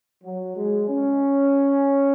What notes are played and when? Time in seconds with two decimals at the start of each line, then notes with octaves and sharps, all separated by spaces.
0.24 F#3
0.56 G#3
0.88 C#4